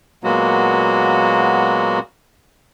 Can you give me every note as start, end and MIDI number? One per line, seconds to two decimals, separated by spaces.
0.24 1.99 46
0.24 1.99 54
0.24 1.99 56
0.24 1.99 58
0.24 1.99 59
0.24 1.99 66